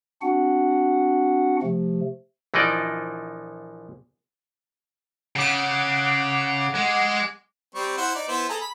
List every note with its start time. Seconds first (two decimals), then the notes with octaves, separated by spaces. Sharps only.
0.22 C4 D4 F#4 F#5
1.62 C3 F3 A3
2.54 A#1 E3 F3 D#4 D5 D#5
5.36 C#3 F#5 D6
6.75 G#3
7.75 G3 C4 C#6
7.98 E4 C5 F#5
8.15 D#4 D5
8.28 B3 E4 C5
8.49 G#4 A4 A#5
8.61 B5